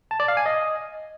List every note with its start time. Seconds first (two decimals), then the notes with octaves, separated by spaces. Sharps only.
0.11 A5
0.20 D5
0.28 F5
0.37 G#5
0.46 D#5